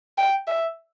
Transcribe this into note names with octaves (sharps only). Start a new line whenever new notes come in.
G5
E5